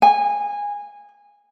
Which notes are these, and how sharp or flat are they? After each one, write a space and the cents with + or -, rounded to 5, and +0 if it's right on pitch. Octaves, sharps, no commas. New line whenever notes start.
G#5 -20